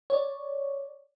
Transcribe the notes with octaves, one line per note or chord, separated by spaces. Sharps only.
C#5 D5